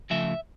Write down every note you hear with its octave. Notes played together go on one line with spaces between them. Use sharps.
C#3 F3 A3 E5